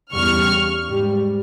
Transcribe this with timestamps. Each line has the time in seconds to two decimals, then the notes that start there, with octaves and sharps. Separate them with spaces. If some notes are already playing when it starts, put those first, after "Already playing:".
0.13 E2 C#3 G3 C#6 F6
0.87 G#2 G3